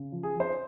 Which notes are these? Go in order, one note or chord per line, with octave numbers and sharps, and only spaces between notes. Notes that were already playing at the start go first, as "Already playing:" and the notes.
Already playing: C#3
F3
G#4
F3 C5